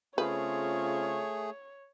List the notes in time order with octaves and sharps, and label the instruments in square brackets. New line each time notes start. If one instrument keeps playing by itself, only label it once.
[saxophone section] C#3 C4 F4 [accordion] A3 G#4 [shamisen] B4 [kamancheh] C#5